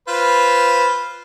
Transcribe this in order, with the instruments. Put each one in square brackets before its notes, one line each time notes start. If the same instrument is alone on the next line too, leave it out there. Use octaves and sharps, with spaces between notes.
[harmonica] F4 B4 C5